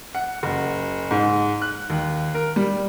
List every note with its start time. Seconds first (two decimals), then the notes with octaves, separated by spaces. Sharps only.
0.15 F#5
0.43 F#1
1.11 G#2
1.62 F#6
1.90 D#2
2.34 A#4
2.56 G3